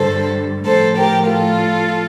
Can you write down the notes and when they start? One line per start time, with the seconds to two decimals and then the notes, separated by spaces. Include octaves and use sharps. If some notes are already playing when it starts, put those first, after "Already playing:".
Already playing: G2 D3 G3 A4 C5
0.66 A2 F3 A4 C5
0.97 G4 A#4
1.28 F4 A4